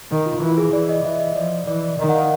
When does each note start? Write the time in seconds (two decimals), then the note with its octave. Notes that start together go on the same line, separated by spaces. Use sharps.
0.11 D#3
0.26 F4
0.41 E3 E4
0.58 G#4
0.73 E3 D5
0.89 D#5
1.05 E3 E5
1.20 D#5
1.36 F3 D5
1.67 E3 D5
1.83 D5
1.99 D#3 D#5
2.09 F#5
2.15 F5